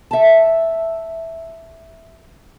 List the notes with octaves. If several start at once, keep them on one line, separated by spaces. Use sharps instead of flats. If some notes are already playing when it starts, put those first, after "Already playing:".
E5 A5